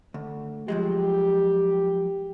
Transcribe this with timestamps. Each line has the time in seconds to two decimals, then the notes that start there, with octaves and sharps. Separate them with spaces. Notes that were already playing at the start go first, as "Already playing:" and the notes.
0.14 D2
0.68 F3 F#3 G#3 G4